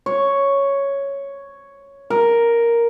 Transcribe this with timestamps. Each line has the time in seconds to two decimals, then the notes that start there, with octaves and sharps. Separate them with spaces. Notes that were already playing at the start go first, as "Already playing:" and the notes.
0.06 C#5
2.10 A#4